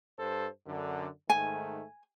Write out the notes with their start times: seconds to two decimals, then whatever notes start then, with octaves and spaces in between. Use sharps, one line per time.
0.18 G2 A4 C5
0.67 F#2 D3
1.30 G#2 D#3 A3 G#5